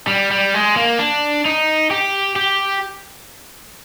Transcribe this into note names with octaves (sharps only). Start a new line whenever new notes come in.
G3
G3
G#3
A#3
D4
D#4
G4
G4